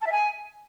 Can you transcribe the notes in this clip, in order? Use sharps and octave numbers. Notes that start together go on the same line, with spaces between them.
A5
E5
G#5